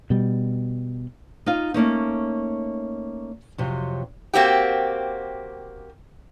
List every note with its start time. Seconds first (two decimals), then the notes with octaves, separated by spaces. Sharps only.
0.10 B2 G3
1.46 D#4 F4 F5
1.74 A3 A#3 C#4 D#4
3.58 F2 C3 F#3
4.34 A#3 C4 F#4 G4